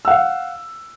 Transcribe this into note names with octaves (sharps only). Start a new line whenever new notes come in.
F5 F#5 E6